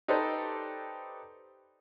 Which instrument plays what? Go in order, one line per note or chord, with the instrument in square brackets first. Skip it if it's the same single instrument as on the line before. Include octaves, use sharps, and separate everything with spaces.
[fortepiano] D#4 G4 A4 B4 C5 D5